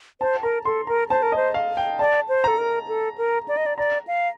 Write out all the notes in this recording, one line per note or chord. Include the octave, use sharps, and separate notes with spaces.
C5 A5
A#4 A#5
A4 C6
A#4 A#5
C5 A5
A#4
C5 D#5
F5
G5
D5 A5
C5
A4 A#5
A#4
A4
A#4
D5
D#5
D5
D5 A#5
F5